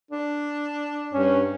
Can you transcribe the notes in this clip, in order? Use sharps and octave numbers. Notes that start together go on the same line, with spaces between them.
D4
G2 C#4